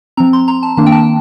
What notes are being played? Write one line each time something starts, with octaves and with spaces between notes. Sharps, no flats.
F3 C4 A#5
C6
A#5
A5
D#3 A#3 D4 A5
G5
A5